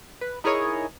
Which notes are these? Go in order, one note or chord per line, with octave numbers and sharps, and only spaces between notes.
B4
D#4 E4 G#4 A#4 C#5 D#5